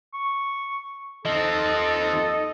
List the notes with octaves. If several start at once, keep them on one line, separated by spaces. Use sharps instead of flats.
C#6
D#2 F3 C4 D#4 A4 D#5 C6